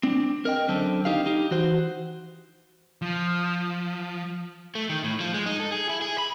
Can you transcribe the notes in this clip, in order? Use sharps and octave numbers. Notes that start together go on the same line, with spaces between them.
C4 D4
A#4 D#5 G5
F#2 D3 C4 A4
D4 D#4 G4 F5
D#4 G4
E3 F#4 C5
F3
A3
D#3
A2
F3
G#3
D#4
A4
G#4
E4
G#4
B5